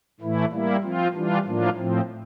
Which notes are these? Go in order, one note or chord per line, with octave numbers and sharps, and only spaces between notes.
A2 E3 A3 E4
G3 A#3 E4
F3 C4 F4
E3 G3 D4 F4
A2 F3 A#3 D4 F4
A2 F3 C4